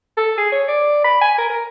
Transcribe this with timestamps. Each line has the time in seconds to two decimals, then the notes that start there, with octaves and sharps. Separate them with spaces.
0.18 A4
0.38 G#4
0.52 C#5
0.68 D5
1.04 B5
1.22 G#5
1.38 A#4
1.50 A#4